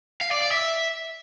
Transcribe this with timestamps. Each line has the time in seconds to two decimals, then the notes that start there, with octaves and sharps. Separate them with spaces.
0.21 F5
0.31 D5
0.41 D5
0.51 E5